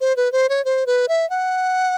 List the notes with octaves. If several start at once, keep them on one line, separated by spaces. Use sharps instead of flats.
C5
B4
C5
C#5
C5
B4
E5
F#5